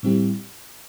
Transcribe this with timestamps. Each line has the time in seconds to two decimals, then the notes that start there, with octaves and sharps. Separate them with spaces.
0.03 A2 G3 C4 E4 G4